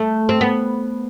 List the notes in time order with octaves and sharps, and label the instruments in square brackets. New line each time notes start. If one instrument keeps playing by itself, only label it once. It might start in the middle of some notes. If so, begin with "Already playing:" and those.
Already playing: [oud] A3
C4
B3